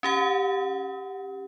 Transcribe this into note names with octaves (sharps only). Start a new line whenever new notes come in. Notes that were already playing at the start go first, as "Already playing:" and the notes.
C#4 G4 F#5